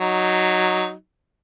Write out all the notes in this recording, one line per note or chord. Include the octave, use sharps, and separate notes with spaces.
F#3 D#4